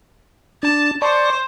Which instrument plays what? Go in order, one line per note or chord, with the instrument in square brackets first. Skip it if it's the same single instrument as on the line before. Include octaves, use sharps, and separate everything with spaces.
[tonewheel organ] D4 [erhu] A5
[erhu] C5 [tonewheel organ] D5 A5 C#6